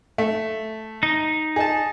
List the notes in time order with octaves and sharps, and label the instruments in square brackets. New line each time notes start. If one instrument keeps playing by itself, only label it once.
[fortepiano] A3
[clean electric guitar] D#4
[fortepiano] G#4 D#5 A5